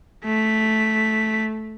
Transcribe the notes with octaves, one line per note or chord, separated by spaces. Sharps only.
A3 B6